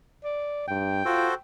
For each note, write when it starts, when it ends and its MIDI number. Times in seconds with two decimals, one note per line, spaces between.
0.24 0.67 74
0.68 1.03 43
0.68 1.41 79
1.05 1.28 65
1.05 1.34 66
1.05 1.34 69
1.05 1.34 72